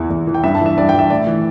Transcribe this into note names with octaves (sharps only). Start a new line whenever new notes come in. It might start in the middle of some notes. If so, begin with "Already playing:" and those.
Already playing: E2 E3
E2
E3
G5
G2 E5
A5
E3
E5
G2 D5
G5
E3 E5
A2 D5
E3